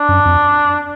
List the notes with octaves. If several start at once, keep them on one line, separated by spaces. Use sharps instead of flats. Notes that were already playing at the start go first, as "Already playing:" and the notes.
Already playing: D4
F#2
F2